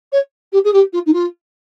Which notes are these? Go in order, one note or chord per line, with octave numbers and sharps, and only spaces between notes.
C#5
G4
G#4
G4
F4
D#4
F4